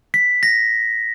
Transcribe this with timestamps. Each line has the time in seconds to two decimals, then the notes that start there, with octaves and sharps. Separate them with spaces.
0.14 B6
0.43 A#6